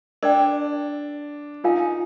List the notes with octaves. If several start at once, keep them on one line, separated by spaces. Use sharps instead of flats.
D4 A#4 D5 G5
D#4 F4 A#4 F5 G#5